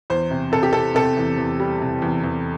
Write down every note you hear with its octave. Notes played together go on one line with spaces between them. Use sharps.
E2 C5
C3
C3 A4
G4
C3 A4
C3 A4
E2
E2
G3
C3
E2
E2